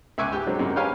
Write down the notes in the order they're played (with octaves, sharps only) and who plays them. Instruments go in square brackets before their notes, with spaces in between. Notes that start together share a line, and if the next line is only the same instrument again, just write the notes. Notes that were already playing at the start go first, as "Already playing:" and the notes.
[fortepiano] C#2 E5 G#5 C#6 D6 F#6
G#2 G4 G5
D3 F#3 G#3 C4
F#2 C3 G#3 A#3
G4 B4 C#5 F5 G#5